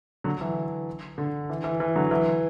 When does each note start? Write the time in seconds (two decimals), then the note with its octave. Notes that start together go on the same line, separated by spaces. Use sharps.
0.24 D3 F#3
0.41 E3
1.18 D3
1.50 E3
1.64 E3
1.80 E3
1.95 D3 F#3
2.11 E3